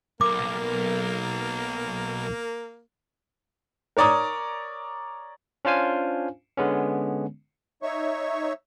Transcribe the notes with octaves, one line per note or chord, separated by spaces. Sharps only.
B1 A#3 A#4 D6
A#4 C#5 D5 A#5 D#6
C#4 D4 F4 C5 F5 G#5
D3 G#3 B3 C#4
D#4 C#5 E5 C#6